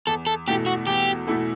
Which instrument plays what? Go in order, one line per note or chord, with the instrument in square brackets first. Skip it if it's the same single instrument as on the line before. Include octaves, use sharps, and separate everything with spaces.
[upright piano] E2 [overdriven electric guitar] A4
[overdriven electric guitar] A4
[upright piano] B2 A3 E4 A4 [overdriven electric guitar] G4
[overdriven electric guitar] F#4
[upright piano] E2 [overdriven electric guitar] G4
[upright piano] B2 A3 E4 A4